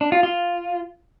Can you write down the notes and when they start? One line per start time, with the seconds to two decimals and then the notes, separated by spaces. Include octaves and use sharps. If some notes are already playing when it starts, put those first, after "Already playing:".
0.01 D4
0.12 F4
0.23 F4